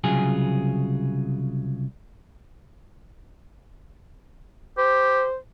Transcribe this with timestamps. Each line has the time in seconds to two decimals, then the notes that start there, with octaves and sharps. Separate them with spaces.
0.04 C2 C#3 F#3 F4 G#4 G#5
4.78 G4 C5